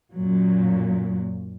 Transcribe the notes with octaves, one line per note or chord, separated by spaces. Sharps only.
F#2 A#2 F#3